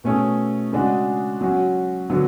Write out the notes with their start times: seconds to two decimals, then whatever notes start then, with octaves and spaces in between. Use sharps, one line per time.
0.04 B2 A3 C#4 G#4
0.72 C#3 G#3 D4 F#4
1.41 F#3 C#4 F#4
2.10 D3 F#3 B3 F#4